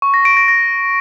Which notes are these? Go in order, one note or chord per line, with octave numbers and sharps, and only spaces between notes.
C#6
A#6
D7
A#6
A#6